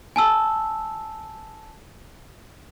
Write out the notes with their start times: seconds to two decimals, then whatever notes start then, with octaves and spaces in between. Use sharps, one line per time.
0.16 G#5 A5 E6